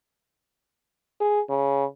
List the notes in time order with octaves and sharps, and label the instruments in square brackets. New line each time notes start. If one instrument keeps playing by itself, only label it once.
[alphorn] G#4
C#3